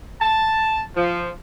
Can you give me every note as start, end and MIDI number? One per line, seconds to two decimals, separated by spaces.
0.21 0.82 81
0.96 1.29 53